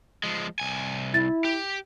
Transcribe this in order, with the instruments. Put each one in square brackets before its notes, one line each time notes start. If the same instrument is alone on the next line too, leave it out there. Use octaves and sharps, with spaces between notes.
[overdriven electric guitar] F3 G#3
C2 G#5
[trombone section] E4 [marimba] A6
[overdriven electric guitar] G4